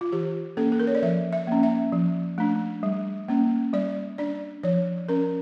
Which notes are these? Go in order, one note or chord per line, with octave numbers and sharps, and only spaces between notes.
F4
E3 G4
A#3 C#4 A4
A4
A#4
C#5
D5
F3 E5
E5
A#3 C#4
E5
F3
A3 D4
G3
A#3 C#4
G3 D5
D4 D5
F3 C#5
C#4 A#4